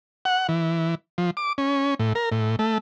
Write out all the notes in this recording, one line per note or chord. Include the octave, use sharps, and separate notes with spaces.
F#5
E3
F3
D6
C#4
A2
A#4
A2
A3